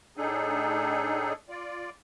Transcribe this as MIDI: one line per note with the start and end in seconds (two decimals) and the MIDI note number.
0.17 1.33 45
0.17 1.33 62
0.17 1.33 63
0.17 1.33 68
0.17 1.33 69
1.49 1.90 65
1.49 1.90 74